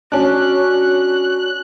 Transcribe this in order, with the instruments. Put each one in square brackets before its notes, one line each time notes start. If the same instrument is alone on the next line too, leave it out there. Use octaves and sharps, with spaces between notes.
[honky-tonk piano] C#4 D4 [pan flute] F#4 [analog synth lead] F#6